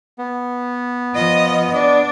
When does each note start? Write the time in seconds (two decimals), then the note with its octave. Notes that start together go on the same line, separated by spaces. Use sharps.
0.18 B3
1.14 F3 D#5
1.74 D4